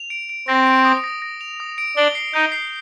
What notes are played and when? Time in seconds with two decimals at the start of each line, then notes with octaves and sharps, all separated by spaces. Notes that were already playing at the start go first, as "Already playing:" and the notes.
Already playing: F7
0.10 D7
0.29 D7
0.48 C4 A#6
0.66 D7
0.85 D#6
1.04 A#6
1.22 A#6
1.41 F7
1.60 D#6
1.78 D7
1.96 D4 G7
2.15 C7
2.33 D#4 G6
2.52 C7